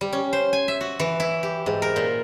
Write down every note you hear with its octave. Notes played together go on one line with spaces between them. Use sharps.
G3
C#4
C5
G#5
E5
F#4
E3
E4
G4
G#2
A#4
A#2